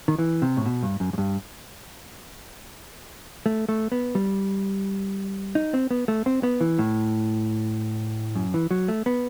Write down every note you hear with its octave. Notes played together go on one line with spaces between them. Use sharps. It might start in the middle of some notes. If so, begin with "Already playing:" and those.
D#3
E3
C3
A2
B2
G2
F#2
F#2
G2
A3
A3
B3
G3
D#4
C4
B3
A3
C4
B3
E3
A2
F#2
E3
F#3
A3
B3